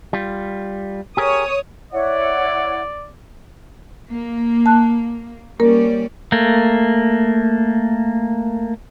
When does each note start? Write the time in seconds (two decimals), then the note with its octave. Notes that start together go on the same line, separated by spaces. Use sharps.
0.13 G3 F4
1.17 G4 G#4 A#4 C#5 D#6
1.92 E4 C#5 D5 F#5
4.09 A#3
4.66 A5 F#6
5.60 G3 A#3 C#4 A#4 D5
6.32 A3 A#3